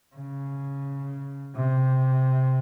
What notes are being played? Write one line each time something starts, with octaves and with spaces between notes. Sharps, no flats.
C#3
C3